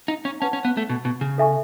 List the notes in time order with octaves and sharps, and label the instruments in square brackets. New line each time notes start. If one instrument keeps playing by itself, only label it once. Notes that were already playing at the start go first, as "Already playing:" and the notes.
[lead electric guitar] D#4
C#4
[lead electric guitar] C#4 [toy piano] B4 F#5 A5
[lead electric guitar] C#4
B3
A3
B2
B2
C#3
[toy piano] A4 E5 G#5 C#6